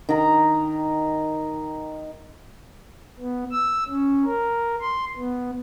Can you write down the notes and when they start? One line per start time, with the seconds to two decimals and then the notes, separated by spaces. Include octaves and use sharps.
0.09 D#3 A#5
3.19 B3
3.52 E6
3.88 C#4
4.25 A#4
4.81 C6
5.17 B3